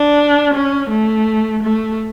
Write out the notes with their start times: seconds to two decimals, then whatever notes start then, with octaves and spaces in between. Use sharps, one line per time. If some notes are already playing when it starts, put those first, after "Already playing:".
Already playing: D4
0.54 C#4
0.90 A3
1.63 A3